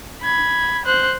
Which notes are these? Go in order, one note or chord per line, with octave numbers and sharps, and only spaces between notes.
B5 G#6
C5 F#6